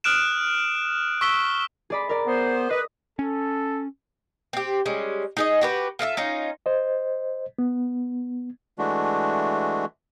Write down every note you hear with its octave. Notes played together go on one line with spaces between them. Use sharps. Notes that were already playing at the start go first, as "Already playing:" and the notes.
D#6 F6 F#6 D7 E7
C#6 E6 B6 G7
G#4 D5 B5
A#4 D5
B3 C5
B4 D#5 D#6
C#4 A4
C4 G4
G3 G#3 C#4
D#4 G#4 D#5
F#4 G4 B4
F4 A4 D#5 E5
C#4 D#4 F4
C5 D#5
B3
E3 G#3 A3 D4 F#4